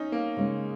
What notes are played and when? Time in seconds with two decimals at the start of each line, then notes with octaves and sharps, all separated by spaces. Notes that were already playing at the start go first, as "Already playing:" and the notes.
Already playing: C#4 D#4
0.12 A#3
0.36 C#3 G#3 C#4